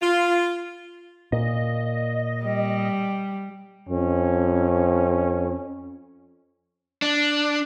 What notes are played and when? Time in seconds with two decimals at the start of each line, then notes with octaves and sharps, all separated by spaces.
0.02 F4
1.32 A#2 D#5
2.45 G3
3.89 F2 C#4
7.02 D4